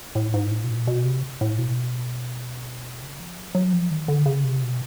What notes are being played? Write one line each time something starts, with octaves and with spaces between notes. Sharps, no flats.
A2
G#2
A2
B2
A#2
B2
C3
A2
B2
C#3
F3
F#3
F3
F#3
F3
D#3
D3
C#3
C3
B2